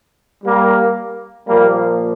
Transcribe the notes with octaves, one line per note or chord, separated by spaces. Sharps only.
G3 A#3
A#2 F3 G3 A#3